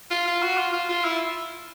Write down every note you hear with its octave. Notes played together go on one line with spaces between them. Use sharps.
F4
F4
F#4
F4
F4
F4
E4